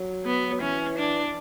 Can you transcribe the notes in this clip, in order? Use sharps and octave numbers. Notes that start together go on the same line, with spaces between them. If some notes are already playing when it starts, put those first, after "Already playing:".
Already playing: F#3
B3
F#3
E3 C#4
D4